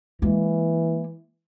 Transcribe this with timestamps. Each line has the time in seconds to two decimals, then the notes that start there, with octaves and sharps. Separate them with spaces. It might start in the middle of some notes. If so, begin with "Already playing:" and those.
0.22 E3 G#3 A#3